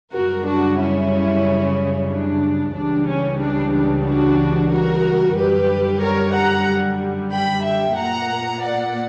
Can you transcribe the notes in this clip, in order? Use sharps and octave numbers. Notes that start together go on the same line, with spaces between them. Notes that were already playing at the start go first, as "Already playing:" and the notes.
F#2 C#3 G3 F#4 A#4
D4 F#4
C#4 E4
D4
C#2 C#3 E3 G3 D4
C#4
D4
D4
D4 F#4
F#4 A#4
F#2 D3 G3 G4 B4
A#4 C#5
F#5 A#5
G5 B5
E5 G5
A#2 A#3 F#5 A#5
D5 F#5